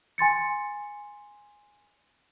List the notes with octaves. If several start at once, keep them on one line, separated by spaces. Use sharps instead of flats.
G#5 C6 A6 C#7